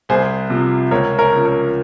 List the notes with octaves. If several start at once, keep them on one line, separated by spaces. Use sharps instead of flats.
C2 G#4 C5
C3 F3
C#2 A#4 C#5
A#4 C#5
C#3 F3
A#4 C#5